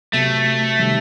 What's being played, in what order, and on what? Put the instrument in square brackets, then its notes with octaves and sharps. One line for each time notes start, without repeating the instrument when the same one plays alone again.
[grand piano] C3 F#3 B3 [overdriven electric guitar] A3
[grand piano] C3 D#3 G3